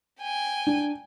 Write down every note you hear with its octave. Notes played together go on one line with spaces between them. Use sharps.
G5 G#5
D4